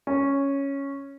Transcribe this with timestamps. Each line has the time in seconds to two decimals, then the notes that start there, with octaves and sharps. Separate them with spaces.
0.07 C#4